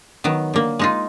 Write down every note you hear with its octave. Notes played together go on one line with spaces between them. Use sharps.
D#3 F#3 B3
D3 A#3
G#3 D#4 F4